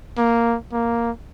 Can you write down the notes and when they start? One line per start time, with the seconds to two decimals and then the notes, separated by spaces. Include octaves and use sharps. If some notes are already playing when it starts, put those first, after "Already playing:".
0.18 A#3
0.72 A#3